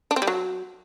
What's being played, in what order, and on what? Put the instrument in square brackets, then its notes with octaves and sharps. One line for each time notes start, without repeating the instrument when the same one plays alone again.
[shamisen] D4
C4
G3
F#3